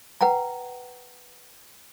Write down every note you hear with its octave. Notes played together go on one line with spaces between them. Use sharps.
B4 F#5 G5 A#5